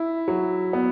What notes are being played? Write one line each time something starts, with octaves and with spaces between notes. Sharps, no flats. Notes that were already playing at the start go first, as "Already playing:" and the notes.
Already playing: E4
F#3
B3